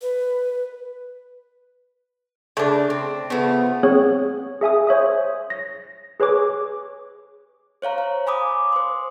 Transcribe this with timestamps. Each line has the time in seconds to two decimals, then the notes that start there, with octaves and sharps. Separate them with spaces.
0.02 B4
2.57 C#3 A3 D4
2.90 C4
3.30 C#3 F3 A3 B3
3.83 B3 C4 G#4 C#5
4.61 G#4 E5 G#5 D#6
4.87 C5 C#5 E5 D#6
5.50 A#6
6.20 G#4 B4 C#5 G#5 D6
7.82 C5 C#5 F5 A#5
7.98 F5
8.26 F5 G#5 B5 D6 D#6
8.73 C5 C6